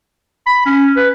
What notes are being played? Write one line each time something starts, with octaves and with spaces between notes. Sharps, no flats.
B5
C#4
B4